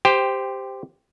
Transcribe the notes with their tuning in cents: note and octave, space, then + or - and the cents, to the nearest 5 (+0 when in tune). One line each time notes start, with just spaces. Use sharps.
G4 +5 C5 -10 G5 +15